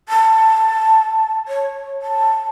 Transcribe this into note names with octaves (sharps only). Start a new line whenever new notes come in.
A5
C#5
A5